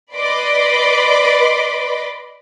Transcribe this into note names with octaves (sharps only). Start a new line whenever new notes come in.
B4 D5 D#5 B5 C6 D6